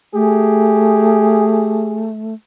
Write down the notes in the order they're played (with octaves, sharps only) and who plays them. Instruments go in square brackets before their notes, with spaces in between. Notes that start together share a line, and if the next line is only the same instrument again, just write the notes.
[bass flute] A3 [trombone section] G4 G#4